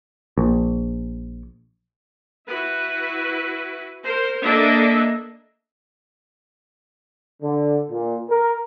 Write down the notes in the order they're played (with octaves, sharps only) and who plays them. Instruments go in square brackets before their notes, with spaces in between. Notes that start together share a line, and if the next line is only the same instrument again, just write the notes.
[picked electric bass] A#1
[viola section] E4 F#4 B4
A#4 C5
A#3 D4 A4 D#5 E5
[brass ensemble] D3
A#2
A#4